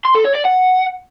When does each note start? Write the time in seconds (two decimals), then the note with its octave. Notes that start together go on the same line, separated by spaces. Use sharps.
0.05 C6
0.15 A4
0.25 C#5
0.35 D5
0.45 F#5